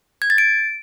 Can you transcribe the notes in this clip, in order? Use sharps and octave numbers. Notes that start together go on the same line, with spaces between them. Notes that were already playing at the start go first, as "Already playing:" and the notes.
G#6
A6
D7